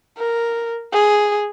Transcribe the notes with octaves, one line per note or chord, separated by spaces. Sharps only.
A#4
G#4